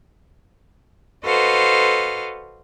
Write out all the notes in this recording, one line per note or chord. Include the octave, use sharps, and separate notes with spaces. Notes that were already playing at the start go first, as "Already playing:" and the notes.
F#4 A4 B4 C5 D#5 F5